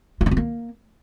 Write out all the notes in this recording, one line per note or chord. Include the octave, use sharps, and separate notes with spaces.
F4
D4
C4
A#3